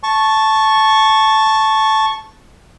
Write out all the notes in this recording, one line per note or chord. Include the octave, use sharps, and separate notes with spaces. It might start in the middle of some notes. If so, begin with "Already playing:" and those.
A5 C#6